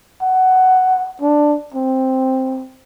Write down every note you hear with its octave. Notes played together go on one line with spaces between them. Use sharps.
F#5
D4
C4